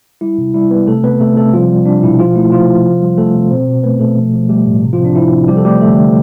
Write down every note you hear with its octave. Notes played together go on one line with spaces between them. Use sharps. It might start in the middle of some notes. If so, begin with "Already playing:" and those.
G3 E4
C3
G3 E4
G3 B3 B4
C3 A3 A4
C3 B3 B4
C3 A3 A4
C3 A3 A4
F3 G3 F4
G3
G3 D4
B2 E4
F3 F4
A3 E4
C3 F3 F4
F3
C3
G3
G3 A3 A4
C3
B2 C4 C5
B2
A3 B3 B4
B2 A3 A4
F3
F3
G3 A3 G4
A2
C3
F3 F4
C3
D4
F3 E4
C3
F3 G3 G4
A4
G3 A3 G4
D3 A3 A4
D3